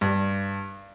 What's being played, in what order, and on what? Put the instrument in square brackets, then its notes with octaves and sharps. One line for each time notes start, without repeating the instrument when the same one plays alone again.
[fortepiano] G2